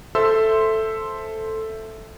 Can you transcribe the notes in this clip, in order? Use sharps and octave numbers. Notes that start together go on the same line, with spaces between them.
A4 C5 E5 C6 E6